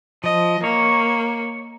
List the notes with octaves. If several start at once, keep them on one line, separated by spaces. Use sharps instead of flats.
F3 D#5
A#3 C#5